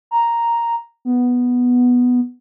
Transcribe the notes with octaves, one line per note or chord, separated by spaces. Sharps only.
A#5
B3